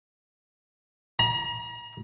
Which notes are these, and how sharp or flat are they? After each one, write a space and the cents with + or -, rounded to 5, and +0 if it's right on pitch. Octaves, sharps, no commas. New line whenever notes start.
A#5 +40